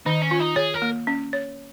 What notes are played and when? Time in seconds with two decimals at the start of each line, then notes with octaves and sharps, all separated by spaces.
0.06 D#3 D#4
0.22 C#4
0.31 F4
0.40 D#4
0.56 G#4 C#5
0.74 A#4
0.82 A#3
1.07 C#4
1.33 C#5